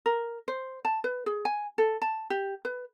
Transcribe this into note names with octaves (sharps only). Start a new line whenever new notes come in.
A#4
C5
A5
B4
G#4
G#5
A4
A5
G4
B4